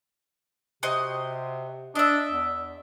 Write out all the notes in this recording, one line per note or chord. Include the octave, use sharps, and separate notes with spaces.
C3 F#4 C5 D#5
D4 D#5 E5
E2